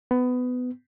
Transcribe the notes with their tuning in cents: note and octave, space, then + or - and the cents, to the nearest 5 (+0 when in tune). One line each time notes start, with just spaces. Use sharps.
B3 +20